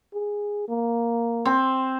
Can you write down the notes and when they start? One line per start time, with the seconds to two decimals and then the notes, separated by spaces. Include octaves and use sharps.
0.14 G#4
0.68 A#3
1.45 C4